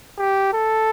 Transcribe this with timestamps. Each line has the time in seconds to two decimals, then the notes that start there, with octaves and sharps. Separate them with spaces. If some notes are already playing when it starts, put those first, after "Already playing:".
0.18 G4
0.54 A4